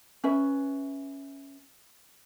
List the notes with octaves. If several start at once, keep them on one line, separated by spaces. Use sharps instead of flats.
C#4 B4 E5